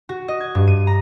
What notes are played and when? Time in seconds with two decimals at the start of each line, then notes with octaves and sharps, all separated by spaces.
0.09 F#4
0.28 D#5
0.40 G#6
0.55 G2
0.67 D#7
0.87 A#5